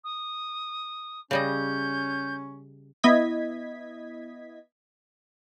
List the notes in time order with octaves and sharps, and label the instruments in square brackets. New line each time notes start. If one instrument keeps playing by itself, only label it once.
[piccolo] D#6
[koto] C#3 G3 D#5 [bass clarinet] C#4 [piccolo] G6
[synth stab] B3 E4 D#5 G#6 B6